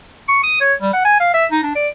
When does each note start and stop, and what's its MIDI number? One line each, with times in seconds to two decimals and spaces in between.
0.28 0.40 85
0.44 0.60 87
0.61 0.74 73
0.81 0.92 55
0.93 1.01 78
1.05 1.18 80
1.20 1.32 77
1.34 1.45 76
1.51 1.61 63
1.63 1.75 62
1.76 1.88 74